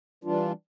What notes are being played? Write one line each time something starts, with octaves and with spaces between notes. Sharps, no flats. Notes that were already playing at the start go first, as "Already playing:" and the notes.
E3 G3 D4 F4